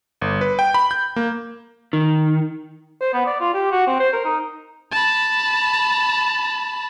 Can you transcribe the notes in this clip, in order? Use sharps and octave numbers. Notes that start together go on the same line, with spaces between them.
G1
B4
G5
B5
G6
A#3
D#3
C5
B3
D5
F4
G4
F#4
C4
C5
A#4
D#4
A5 B5